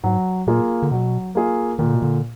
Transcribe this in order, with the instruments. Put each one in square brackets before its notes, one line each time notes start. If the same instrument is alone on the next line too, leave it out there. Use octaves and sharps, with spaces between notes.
[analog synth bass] G#2 [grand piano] F#3
[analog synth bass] A#2 [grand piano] A#3 F4 G#4
[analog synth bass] D3
[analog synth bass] B2 [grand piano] F#3
[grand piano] A#3 F4 G#4
[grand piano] A#2 [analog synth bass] D#3
[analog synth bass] D3
B2
D3